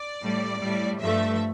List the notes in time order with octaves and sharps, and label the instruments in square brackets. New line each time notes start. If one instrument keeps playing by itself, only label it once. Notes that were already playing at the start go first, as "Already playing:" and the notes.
Already playing: [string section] D5
A2 G3
A2 G3
G2 F3 A3 E5